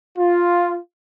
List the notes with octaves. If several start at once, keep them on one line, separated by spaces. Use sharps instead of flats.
F4